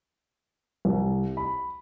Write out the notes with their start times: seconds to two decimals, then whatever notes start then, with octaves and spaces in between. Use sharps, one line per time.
0.85 C2
1.37 B5